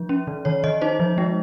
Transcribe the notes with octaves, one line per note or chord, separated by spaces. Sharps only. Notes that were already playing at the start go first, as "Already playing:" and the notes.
Already playing: F3
C#4
D#3
D#3 C#5
D#3 D#5
D#4 C5
F3
G#3